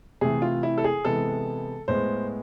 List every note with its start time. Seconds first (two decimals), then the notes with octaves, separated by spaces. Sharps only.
0.21 C3 E3 A3 G#4
0.42 F4
0.63 E4
0.78 A4
0.84 G#4
1.05 C3 E3 G#3 B3 A4
1.88 A2 G#3 B3 C5